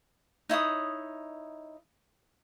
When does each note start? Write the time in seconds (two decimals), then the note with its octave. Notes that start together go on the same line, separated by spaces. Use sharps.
0.49 D#4 E4 C#5 D#6